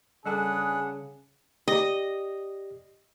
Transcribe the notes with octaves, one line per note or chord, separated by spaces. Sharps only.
C#3 G3 D4 G#4 A4 B4 F#5 A5
G4 D5 D#5